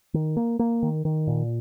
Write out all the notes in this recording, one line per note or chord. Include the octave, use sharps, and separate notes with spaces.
D#3
A#3
A#3
D#3
D#3
A#2